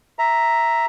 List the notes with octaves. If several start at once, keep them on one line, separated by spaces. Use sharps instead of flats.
E5 A#5